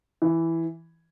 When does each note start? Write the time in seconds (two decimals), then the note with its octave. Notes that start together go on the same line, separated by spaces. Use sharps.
0.22 E3